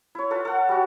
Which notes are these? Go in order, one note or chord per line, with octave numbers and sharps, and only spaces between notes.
E4 C#5
F4 A4 B4
A4 F#5
G3 F#4